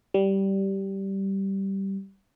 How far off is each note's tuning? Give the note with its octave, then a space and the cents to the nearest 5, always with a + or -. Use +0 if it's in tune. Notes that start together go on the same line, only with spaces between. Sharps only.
G3 -10